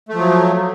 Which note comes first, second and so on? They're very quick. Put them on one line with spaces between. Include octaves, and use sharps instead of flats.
A3 F3 F#3